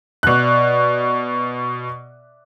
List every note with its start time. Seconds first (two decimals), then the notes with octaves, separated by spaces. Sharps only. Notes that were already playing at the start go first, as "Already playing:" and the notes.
0.23 B2 D5 E5 F#6